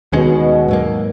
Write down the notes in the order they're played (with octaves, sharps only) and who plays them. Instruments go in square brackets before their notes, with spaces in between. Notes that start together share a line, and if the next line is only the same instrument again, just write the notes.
[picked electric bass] D#2 D#3 G#3 C#4 [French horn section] B2
[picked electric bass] G#2 F#3 A#3